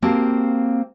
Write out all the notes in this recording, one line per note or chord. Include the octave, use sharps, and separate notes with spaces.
A#3 C4 F#4 G4 A5